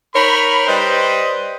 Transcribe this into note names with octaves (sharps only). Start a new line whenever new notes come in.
D#4 A#4 C#5 B5
G3 B4 C5 D#5